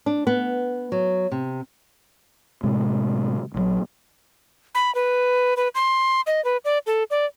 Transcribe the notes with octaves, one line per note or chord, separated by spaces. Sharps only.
D4
B3
F#3
C3
A2 C3 G#3
A#1 E3 F#3
B5
B4
B4
C6
D#5
B4
D5
A4
D5